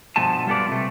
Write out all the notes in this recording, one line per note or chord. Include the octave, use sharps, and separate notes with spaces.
G2 B2 F3 A3 G#5 A5
G3 F4 A4 B4 D5
C3 A3